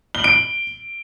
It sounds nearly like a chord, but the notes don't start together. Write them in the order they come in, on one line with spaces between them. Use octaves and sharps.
G7 F#7 D7